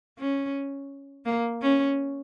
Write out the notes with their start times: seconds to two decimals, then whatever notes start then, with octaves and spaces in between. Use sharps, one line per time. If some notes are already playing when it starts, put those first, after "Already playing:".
0.18 C#4
1.25 A#3
1.62 C#4